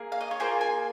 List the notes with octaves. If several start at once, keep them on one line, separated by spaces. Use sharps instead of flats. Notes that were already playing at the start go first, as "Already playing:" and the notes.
Already playing: A#3 G#4
F5
D#5
C#5
A#3 F4 G#4 C5
G#5